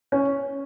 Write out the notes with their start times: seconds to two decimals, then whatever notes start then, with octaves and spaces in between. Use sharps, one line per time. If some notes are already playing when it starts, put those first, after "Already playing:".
0.12 C#4